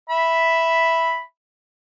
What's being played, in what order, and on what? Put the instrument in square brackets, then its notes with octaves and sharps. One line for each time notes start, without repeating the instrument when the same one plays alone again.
[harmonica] E5 B5